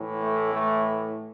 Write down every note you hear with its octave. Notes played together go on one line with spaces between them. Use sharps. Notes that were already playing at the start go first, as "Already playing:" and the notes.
Already playing: A2 E3
A3
A3